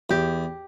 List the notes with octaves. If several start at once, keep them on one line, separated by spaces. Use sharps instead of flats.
E2 G4